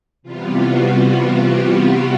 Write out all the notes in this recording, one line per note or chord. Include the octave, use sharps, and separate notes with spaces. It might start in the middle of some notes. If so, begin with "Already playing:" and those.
C3 E3 G3 B3 F4
F#4
F#4
G4